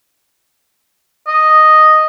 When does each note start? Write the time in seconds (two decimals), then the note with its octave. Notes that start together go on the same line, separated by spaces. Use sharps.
1.28 D#5